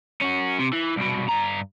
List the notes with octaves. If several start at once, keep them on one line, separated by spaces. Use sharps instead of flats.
C#4 F#4
C3
E3
C2 B2
G2 A#5